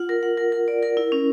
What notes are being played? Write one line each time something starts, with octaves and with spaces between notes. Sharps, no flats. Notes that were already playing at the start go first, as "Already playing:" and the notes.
Already playing: F4 F#5
A#4
F#5
A#4
A#4
D5
A#4
E4
C#4